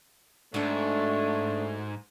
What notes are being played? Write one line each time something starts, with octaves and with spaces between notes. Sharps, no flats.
G#2 A3 D4 F#4 A4